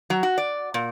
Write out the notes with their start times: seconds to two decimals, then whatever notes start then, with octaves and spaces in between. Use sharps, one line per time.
0.10 F#3
0.23 F#4
0.38 D5
0.74 A#2